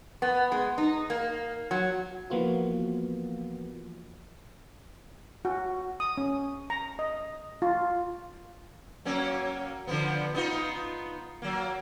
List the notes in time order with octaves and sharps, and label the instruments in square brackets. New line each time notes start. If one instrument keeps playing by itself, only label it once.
[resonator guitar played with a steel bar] B3
G#3
D#4
A#3
F#3
[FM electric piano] E3 F3 A#3 B3 F4 F#4
[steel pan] F#4
D#6
C#4
A#5
D#5
F4
[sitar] F#3 A#3 C#4
D3 F3 B3
B3 D#4 F4
F#3 A#3